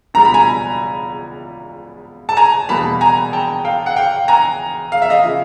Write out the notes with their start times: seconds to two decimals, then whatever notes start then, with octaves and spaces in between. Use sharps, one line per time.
0.14 C#2 B2 G3 A#5
0.25 B5
0.34 G#5 A#5
2.29 A5
2.37 G#5 A#5
2.69 E2 B2 G3 A#3 A5 B5
3.01 G#5 A#5
3.33 G5 A5
3.65 F5 G5
3.86 F#5
3.96 F5 G5
4.28 G#5 A#5
4.92 F5
5.02 E5
5.10 D#5 F5
5.24 C#3 F3